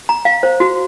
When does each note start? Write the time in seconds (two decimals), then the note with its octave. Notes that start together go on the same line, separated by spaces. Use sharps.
0.09 A#5
0.25 F5
0.43 C5
0.60 F#4